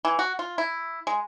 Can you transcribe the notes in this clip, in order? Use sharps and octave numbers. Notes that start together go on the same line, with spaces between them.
E3
F#4
F4
E4
G#3